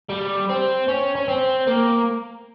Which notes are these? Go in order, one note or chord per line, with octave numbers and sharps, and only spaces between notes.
G3
C4
C#4
C#4
C4
A#3